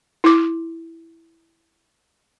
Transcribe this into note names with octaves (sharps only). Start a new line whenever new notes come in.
E4 D6